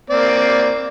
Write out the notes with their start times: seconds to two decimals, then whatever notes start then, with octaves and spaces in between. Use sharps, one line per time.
0.10 A#3 C4 D5